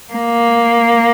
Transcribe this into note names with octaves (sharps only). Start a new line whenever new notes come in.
A#3